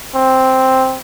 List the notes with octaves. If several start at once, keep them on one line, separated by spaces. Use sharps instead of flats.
C4